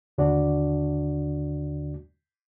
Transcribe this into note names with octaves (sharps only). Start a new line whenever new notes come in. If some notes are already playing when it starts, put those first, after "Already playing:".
D#2 D3 D4 F#4 D5